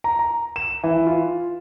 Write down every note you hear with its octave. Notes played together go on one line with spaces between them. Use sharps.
A#5
A#5
E7
E3
F4